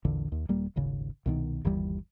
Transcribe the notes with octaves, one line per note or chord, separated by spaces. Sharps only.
A#1 E2 D3
D#2
D#1 G3 A#3
D#1 G#1 C#3
C2 B2 D#3
G1 D#2 E3 G3